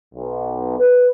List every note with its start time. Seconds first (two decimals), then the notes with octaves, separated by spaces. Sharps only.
0.15 B1
0.78 B4